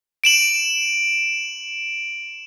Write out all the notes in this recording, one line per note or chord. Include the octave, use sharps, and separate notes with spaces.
D7 E7 F#7